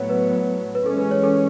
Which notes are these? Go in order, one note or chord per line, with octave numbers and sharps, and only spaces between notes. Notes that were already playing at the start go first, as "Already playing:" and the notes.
Already playing: A2 F#3 B3 C#5
B4
B4
E3 G#3 C#4 A4
B4
C#5
A4